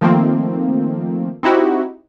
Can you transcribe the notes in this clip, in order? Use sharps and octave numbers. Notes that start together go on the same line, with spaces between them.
D#3 F3 A3 A#3 C4
C4 D#4 E4 F#4 G4